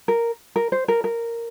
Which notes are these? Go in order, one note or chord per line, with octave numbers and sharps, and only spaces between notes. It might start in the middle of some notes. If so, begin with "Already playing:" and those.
A#4
A#4
C5
A#4
A#4